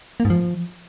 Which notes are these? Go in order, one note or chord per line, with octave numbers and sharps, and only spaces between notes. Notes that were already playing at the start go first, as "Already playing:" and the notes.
A#3
G#2
F3